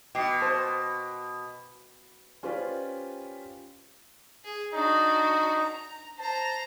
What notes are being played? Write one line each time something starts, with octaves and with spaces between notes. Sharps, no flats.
B2 G5 D6 C7
C5 A5
C#4 F4 G4 B4 C5 D5
G#4
D4 D#4 F#4
A#5
C5 A5 A#5